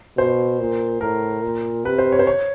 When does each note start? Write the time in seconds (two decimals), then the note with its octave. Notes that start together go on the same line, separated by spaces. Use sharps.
0.17 B2 C5
0.60 A#2
1.01 A2 A#4
1.43 A#2
1.85 C3 B4
1.98 C5
2.12 C#5
2.19 C5
2.27 C#5